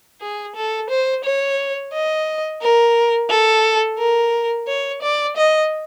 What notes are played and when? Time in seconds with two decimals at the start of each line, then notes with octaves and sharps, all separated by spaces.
0.21 G#4
0.55 A4
0.90 C5
1.24 C#5
1.93 D#5
2.62 A#4
3.30 A4
3.98 A#4
4.67 C#5
5.02 D5
5.36 D#5